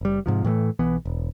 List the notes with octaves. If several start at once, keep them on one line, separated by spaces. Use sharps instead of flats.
F#1 G3
G#2 C3 F3
A2 E3 G3 A3
B1 E3 B3
E1